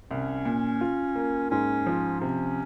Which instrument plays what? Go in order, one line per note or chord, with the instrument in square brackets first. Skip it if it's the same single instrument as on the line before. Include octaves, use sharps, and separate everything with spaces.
[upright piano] C2 [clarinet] C#4
[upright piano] A#2
F4
A#3
[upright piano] G#2 [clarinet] C#4
[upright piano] F3
[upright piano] C3 [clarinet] C#4